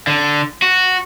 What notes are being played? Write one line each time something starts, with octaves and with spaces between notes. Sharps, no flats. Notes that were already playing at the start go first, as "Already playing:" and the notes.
D3
F#4